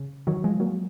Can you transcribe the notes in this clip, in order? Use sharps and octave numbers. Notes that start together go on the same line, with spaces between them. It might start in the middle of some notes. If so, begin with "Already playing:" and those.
Already playing: C#3
D#3 F#3
F3 G#3
F#3 A#3